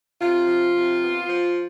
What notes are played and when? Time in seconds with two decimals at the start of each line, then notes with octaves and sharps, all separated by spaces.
0.19 C3 F4
0.47 F3
0.75 C3
1.03 B3
1.29 F3